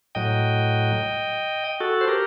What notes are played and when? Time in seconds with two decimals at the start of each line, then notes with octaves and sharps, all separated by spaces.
0.15 A2 F#3 D#5 G5
1.80 F#4 A4
2.01 C5
2.08 G4 A#4